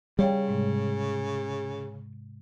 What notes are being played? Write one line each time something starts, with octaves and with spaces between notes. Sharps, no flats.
C#3 G3 C#5 F5 G5
G#2 C3 G#3